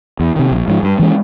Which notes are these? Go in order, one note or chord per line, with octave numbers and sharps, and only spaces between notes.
E2
C3 D#3
A#1
G#2 F3
G2
E3 G#3 C#4